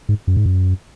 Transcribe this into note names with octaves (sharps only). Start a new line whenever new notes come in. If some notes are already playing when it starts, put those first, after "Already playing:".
G#2
F#2
G#2
F#2